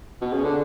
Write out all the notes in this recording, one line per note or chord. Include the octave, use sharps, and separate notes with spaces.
B2
C#3
D3